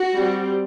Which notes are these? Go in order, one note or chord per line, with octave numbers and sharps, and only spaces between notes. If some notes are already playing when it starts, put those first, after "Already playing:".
Already playing: F#4
G3 C4